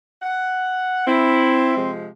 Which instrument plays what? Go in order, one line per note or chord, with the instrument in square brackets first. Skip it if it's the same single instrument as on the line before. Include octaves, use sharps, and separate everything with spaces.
[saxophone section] F#5
[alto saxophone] C4 [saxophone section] E4
[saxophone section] C3 F3 G#3